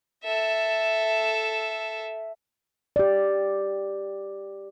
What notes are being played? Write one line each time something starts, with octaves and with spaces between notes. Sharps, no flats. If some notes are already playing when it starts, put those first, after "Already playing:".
A4 E5
G4 D5